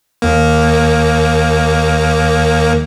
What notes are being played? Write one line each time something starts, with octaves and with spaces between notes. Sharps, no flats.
D#2 A#3